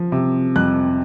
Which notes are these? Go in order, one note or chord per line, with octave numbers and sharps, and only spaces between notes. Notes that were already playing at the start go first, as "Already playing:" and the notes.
Already playing: F3
C3
F2 F#6